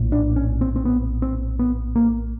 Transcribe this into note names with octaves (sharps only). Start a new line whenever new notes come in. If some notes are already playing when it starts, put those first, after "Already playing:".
Already playing: A#1 A2
D4
C#4
C4
C4
B3
C4
B3
A#3